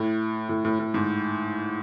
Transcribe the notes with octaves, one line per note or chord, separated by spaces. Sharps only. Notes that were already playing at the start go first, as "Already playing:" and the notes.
Already playing: A2
A2
A2
A2
G#2